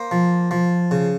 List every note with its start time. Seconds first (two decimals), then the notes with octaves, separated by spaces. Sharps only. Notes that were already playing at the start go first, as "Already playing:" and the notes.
Already playing: A#3 C5
0.11 F3
0.51 F3
0.91 C#3